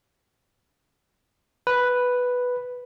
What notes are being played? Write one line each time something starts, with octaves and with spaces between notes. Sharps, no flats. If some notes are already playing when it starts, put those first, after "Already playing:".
B4